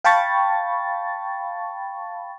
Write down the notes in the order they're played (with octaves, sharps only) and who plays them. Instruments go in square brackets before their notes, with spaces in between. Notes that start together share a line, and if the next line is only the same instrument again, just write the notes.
[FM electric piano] F5 G5 A5 B5 C#6 A6